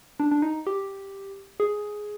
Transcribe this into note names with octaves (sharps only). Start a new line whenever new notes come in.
D4
D4
D#4
G4
G#4